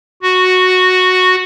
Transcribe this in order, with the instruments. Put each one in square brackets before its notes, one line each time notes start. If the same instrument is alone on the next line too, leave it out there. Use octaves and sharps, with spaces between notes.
[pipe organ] F#4